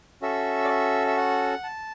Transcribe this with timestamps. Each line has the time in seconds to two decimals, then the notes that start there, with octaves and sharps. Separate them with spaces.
0.22 C#4 F#4 A4 E5
0.65 D5
0.70 E5
1.07 E5
1.17 F#5
1.64 A5